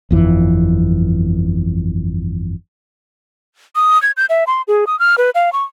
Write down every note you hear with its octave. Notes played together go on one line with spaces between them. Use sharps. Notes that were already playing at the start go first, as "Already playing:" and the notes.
G1 F2 E3
D#6
G#6
G6
E5
C6
G#4
D#6
F6
B4
F5
C#6